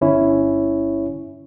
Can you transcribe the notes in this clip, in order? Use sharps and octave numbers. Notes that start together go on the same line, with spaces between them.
G1 C#4 E4 C#5